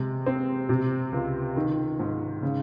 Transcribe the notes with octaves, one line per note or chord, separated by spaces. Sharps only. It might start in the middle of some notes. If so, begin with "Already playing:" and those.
Already playing: C3 G#3
C4
C3
C#2
D#3
G#2
C#3